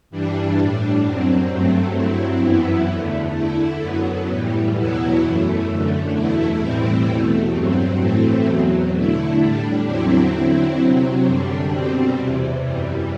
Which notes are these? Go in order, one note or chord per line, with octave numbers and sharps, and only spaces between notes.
G2 E3 G3 D4
A2 G3 D4
F#2 F#3 C4
G2 F#3 A3 C4
G2 F#3 C4 E4
F#2 E3 B3 E4
E2 D3 A3
D3 A3 E4
F#2 F#3 B3
A2 E3 G3
E2 B2 F#3 B3 E4
F#2 E3 A3
F#2 D3 A3
E2 B2 A3 E4
A2 E3 G3 C4 E4
E2 B2 A3
G2 F#3 C4
A2 E3 A3 C4
E2 B2 F#3
D3 A3 E4
A2 G3 D4
E2 D3 F#3 C4 E4
D3 F#3 C4 E4
C3 F#3 C4
F#2 D3 G3 D4
B2 G3 C4
E2 C3 E3
F#2 E3 G3